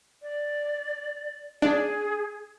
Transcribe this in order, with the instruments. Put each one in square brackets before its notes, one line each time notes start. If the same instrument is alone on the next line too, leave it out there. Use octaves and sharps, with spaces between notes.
[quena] D5
[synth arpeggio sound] D4 [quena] G#4